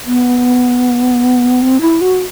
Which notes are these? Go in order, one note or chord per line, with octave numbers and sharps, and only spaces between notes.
B3
C4
E4
F#4